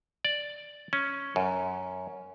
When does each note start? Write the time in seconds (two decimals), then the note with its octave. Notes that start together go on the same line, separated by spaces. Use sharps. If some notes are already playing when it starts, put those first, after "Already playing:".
0.25 D5
0.93 C#4
1.36 F#2